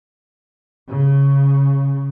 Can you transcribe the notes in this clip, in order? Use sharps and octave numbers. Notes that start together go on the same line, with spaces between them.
C#3